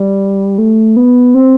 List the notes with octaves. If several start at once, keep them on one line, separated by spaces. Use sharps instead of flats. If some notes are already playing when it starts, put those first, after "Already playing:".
Already playing: G3
A3
B3
C4